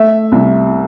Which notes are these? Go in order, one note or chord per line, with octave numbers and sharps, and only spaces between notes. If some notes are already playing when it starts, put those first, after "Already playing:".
Already playing: A3 E5
C2